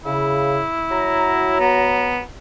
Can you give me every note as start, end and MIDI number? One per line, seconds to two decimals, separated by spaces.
0.05 0.61 49
0.05 1.56 64
0.91 2.24 54
0.91 2.24 82
1.60 2.21 59